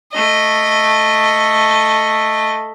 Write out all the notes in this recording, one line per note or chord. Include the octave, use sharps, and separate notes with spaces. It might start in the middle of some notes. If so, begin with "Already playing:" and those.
A3 D#5